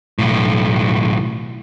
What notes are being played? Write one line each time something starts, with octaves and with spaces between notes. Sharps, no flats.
B1 A2